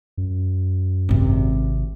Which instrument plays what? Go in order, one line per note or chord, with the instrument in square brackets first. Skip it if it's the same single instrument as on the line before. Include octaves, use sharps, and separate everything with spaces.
[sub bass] F#2
[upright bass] G#1 C3